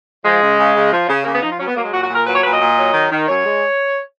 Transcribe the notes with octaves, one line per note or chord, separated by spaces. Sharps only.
F3 G#3
C#3
C#3
C#3
F3
C#3
C#3 A#3
B3
F3 D#4
F4
F#3 C#4
B3
F#3 A#3
G#3
A#2 F#4
F#4
A#2
A#4
F#3 B4
C#5
A#2 B4
D#5
A#2
F#3
D#3
D#3
F#2 C#5
G#3